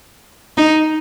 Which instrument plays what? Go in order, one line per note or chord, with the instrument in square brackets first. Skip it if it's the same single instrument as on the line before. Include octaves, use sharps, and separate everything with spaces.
[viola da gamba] D#4